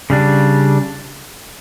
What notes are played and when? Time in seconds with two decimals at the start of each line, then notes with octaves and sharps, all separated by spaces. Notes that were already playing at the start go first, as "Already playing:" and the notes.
0.10 C#3 G3 D4